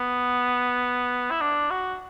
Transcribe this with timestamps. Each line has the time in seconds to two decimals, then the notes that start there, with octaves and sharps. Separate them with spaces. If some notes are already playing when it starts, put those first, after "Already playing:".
Already playing: B3
1.31 E4
1.41 D4
1.71 F#4